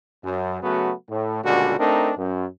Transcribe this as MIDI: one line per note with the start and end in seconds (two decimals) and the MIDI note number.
0.23 0.58 42
0.62 0.92 49
0.62 0.92 54
0.62 0.92 57
0.62 0.92 59
0.62 0.92 66
1.09 1.40 45
1.43 1.76 37
1.43 1.76 46
1.43 1.76 50
1.43 1.76 55
1.43 1.76 66
1.78 2.11 57
1.78 2.11 60
1.78 2.11 62
1.78 2.11 63
1.78 2.11 70
2.17 2.45 42